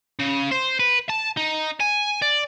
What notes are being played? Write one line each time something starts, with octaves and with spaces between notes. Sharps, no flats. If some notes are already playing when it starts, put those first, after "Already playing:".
C#3
C5
B4
A5
D#4
G#5
D5